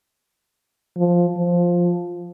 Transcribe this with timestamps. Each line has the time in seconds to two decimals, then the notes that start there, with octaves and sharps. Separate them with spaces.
0.97 F3
1.38 F3